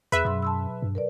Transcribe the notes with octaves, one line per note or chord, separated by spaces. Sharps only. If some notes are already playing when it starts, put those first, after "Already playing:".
E2 G#4 B4 E5
F#2 B2 F#3 C6
A5 C6 E6
G2
A#4 B4 D5